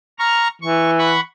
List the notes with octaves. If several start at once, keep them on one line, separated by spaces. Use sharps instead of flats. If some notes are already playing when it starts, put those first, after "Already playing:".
A#5 C#6 F6
E3 C#6
F#5 B5 C#6